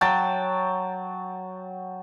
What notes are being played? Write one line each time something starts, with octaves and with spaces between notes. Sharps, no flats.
F#3 G5 A5